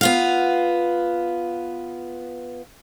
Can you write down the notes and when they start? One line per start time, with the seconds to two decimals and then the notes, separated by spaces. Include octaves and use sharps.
0.01 B3 F4 F5